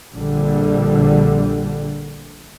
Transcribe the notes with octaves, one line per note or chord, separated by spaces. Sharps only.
A#1 D3 G3